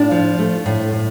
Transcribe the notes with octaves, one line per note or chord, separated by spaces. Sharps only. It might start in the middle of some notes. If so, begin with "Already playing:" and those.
Already playing: A2 D4
F3
A3
A2
A2